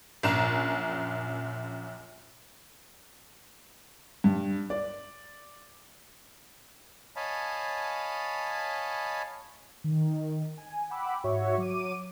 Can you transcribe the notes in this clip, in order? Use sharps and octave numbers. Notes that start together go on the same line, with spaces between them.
A#1 F#2 A#5 E7
G2
D5
C#5 D#5 F5 G#5 A5 B5
D#3
G#5
F#5 G5 B5 D6 E6
G#2 F#4 C#5 E5 C#6
F#3 D6 D#7